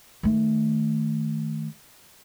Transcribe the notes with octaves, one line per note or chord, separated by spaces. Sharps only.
D#3 A3